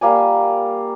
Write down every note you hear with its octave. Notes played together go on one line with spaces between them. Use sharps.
G3 A#3 D5 G#5